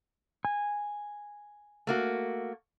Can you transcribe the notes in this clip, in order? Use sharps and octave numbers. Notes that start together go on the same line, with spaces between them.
G#5
A3 A#3 F#4